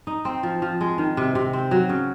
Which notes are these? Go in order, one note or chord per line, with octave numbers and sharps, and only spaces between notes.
D#4
C4
F3
F3
G#3
D#3
C3
C3
C4
F#3
C#3